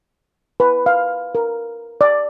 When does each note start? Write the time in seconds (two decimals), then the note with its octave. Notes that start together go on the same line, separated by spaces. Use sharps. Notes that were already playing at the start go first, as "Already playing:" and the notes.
0.60 B4
0.86 F5
1.35 A#4
2.01 D5